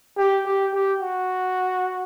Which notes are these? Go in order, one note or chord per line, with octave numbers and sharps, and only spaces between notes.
G4
G4
G4
F#4